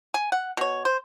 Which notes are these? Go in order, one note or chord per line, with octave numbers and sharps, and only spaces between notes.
G#5
F#5
B2 C#5
C5